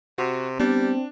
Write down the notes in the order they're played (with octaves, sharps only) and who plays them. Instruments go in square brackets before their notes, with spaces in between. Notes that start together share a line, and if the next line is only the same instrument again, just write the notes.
[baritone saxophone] C3 [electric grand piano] F#4
[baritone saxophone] G3 [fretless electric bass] B3 [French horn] C4 [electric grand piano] D4